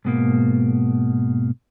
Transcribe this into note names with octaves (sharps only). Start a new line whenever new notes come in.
G#2 B2 A#3